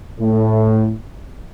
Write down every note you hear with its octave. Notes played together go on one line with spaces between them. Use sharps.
A2